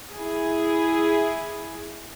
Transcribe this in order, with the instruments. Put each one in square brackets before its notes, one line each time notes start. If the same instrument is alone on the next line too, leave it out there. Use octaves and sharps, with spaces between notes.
[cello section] E4 G#4